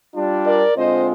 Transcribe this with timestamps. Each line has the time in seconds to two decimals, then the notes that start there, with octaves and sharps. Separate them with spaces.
0.15 G3 D4 F4
0.45 A#4 D5
0.76 D3 G#3 C4 F4 C5 D#5